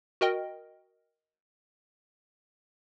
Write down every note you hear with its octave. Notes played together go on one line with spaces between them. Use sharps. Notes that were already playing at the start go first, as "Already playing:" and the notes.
F#4 A#4 D#5 G5